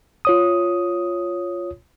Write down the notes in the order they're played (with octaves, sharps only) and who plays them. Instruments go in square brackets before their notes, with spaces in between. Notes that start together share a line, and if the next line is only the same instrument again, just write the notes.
[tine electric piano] F4 C#5 D#6